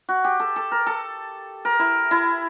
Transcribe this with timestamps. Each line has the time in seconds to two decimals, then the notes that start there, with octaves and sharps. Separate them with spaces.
0.09 F#4
0.25 G4
0.40 A4
0.56 A4
0.71 A#4
0.86 A4
1.65 A#4
1.79 E4
2.11 E4